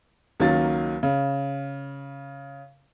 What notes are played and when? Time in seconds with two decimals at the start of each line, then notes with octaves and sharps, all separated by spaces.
0.40 C#2 D#3 F#3 A#3 A6
1.03 C#3